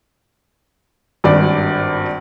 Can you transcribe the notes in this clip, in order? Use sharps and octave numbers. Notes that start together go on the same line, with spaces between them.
G#1 G2 D5